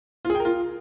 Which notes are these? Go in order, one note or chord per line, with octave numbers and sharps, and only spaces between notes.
F4
G#4
G5
A#4
F4